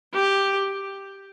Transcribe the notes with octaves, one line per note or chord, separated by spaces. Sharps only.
G4